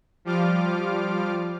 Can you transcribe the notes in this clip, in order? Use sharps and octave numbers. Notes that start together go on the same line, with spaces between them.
F3 G3 F4 D6 F6